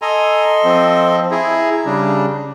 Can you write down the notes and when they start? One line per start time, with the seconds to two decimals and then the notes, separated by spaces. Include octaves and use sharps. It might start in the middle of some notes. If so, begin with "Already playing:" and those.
0.02 A4 D#5 G#5 A#5 C6
0.64 F3 C4
1.31 E4 G#4 A#5
1.86 C#3 G3 D4